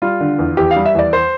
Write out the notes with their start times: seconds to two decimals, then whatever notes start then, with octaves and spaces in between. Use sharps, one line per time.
0.02 G3 F4
0.20 D3
0.39 E2
0.57 E2 G4
0.71 F5
0.76 G3
0.86 E5
0.94 E2 D5
1.13 C5